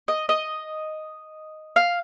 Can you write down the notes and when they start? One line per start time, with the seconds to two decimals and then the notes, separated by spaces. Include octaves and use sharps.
0.08 D#5
0.29 D#5
1.76 F5